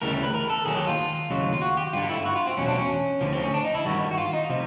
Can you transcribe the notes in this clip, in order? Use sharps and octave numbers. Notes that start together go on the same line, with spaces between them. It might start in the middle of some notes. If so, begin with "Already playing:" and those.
D2 C#3 E3 G3 A#4
B4
A#4
A4
D#2 D#3 F#3 G#4
G4
F4
D#2 C#3 F#3
F4
F#4
G4
G2 D3 G3 F4
E4
F#4
F4
C4
E2 B2 F#3 C#4
D4
C#4
D2 D3 F3
C4
C#4
D4
D#4
E4
G2 D#3 G3 F#4
F#4
F4
D#4
C3 F3